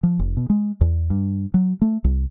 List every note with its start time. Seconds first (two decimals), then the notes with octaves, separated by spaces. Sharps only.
0.03 F3
0.19 F1
0.37 B2
0.50 G#3
0.81 E2
1.10 G2
1.54 F#3
1.82 A3
2.04 C2